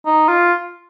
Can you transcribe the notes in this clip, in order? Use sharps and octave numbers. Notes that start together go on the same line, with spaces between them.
D#4
F4